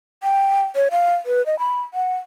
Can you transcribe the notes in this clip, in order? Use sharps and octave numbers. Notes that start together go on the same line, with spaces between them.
G5
C#5
F5
B4
D#5
B5
F#5